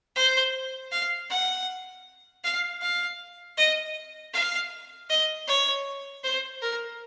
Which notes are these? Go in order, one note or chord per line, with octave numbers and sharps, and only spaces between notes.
C5
F5
F#5
F5
F5
D#5
F5
D#5
C#5
C5
A#4